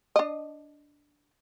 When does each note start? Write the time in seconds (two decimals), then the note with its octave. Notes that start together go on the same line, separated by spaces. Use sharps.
0.16 D4 D#5